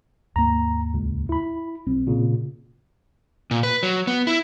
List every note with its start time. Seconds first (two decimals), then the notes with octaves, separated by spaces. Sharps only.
0.36 D#2 G#2 A#3 A#5
0.94 C#2
1.29 E4 B5
1.87 B1 C4
2.07 A#2 C#3
3.51 A#2
3.63 B4
3.83 F#3
4.07 B3
4.27 E4